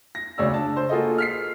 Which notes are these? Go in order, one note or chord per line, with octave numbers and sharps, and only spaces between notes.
A#6
D2 C#3 C#5 D5 E6
D4 A5
C5
A#3 F4 F#4 G#4 A4 D#5
F6 B6 C7